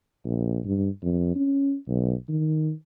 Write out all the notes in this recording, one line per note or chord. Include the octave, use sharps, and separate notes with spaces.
A#1
G2
F2
C#4
B1
D#3